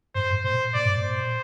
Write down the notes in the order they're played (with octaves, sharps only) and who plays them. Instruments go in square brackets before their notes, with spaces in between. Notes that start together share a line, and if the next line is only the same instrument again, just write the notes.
[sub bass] G2 [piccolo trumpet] C5
[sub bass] G2
[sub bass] A#2 [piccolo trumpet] C5
[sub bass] A#2 [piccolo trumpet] D5
[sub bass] G2
A#2
[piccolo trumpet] C5